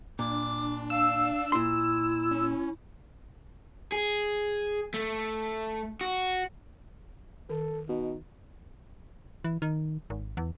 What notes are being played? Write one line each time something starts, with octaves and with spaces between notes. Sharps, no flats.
A#2 D4 D6
F5 E6
A#2 E4 C6
C#4
G#4
A3
F#4
D#3 A4
B2 D#4
E3
D#3
G#1
E2